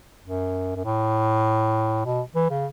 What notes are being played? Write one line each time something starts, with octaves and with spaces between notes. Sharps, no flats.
F#2
F#2
A2
B2
E3
C#3